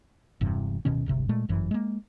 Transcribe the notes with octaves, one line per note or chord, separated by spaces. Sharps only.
E1 E2 G2 C3
D1 B2 D#3 C#4
D1 G1 C3
A#2 G#3 A3
G1 F#2 E3
G#3 A#3